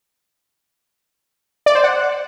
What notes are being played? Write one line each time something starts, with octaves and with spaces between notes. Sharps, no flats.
D5
C5
F#5